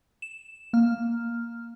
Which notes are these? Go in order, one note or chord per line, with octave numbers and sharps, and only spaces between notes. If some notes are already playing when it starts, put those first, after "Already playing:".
E7
A#3 F6